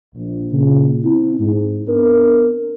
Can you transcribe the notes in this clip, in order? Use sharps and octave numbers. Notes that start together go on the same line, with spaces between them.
A#1
A#2 C#3
C4 E4
G#2
B3 C4 D4 A#4